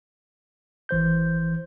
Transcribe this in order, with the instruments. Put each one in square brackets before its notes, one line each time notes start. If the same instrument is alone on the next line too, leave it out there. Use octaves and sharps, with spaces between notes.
[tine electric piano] G#1 E3 C5 G6